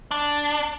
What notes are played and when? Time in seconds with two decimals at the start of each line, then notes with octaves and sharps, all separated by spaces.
0.11 D4